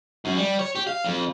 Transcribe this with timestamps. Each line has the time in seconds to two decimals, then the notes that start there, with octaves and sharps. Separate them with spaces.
0.25 F#2
0.37 G3
0.59 C#5
0.75 G4
0.87 F5
1.04 F2